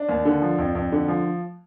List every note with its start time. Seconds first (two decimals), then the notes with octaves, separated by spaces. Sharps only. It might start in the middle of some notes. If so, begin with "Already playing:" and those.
Already playing: D4
0.09 D#2
0.25 D3
0.42 F3
0.58 F2
0.75 F2
0.92 D3
1.08 F3